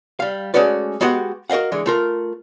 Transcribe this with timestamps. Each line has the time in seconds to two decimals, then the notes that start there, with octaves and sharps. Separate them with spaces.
0.20 G3 F5
0.54 G#3 A3 C#4 F#4 B4 D5
1.01 G#3 B3 F#4 G4 F#5
1.50 F#4 A#4 D#5 F5 F#5
1.72 D3 E3 G#3
1.86 A3 F4 A#4